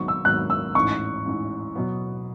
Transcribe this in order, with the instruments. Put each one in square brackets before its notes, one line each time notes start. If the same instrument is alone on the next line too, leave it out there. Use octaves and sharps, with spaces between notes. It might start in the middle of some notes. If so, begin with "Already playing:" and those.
Already playing: [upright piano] G#1 G#2 F#3 B3 [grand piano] C#6
[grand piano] E6
[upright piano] G#1 G#2 F#3 B3 [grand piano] F#6
[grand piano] E6
[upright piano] A1 G#2 E3 [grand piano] C#6
[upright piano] A1 G#2 E3
B2 F#3 B3